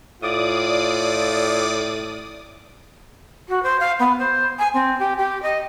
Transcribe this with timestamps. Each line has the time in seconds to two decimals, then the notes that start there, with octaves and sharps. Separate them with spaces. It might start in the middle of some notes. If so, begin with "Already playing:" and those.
0.22 A2 F4 D5 D6 D#6
3.48 F#4
3.62 C5
3.80 F5
3.99 B3
4.18 C5
4.58 G#5
4.73 C4
4.99 G4
5.17 G4
5.42 D#5